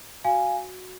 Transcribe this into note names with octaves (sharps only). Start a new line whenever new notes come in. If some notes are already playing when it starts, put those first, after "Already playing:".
F#4 F5 G#5